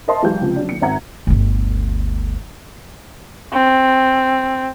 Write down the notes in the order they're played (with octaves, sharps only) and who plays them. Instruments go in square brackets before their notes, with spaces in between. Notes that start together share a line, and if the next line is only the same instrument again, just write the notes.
[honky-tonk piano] A#4 C5 D#5 E5 A5 C6
E3 F#3 G#3 G4 F5 G6
C#2 C3 F3
F#3 C#4 D4
D#2 C#7
G#1 C4 E5 F#5 A#5 G#6
[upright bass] G1 D2
[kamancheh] C4